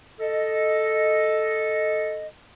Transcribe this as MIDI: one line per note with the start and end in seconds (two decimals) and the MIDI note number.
0.20 2.26 69
0.20 2.26 75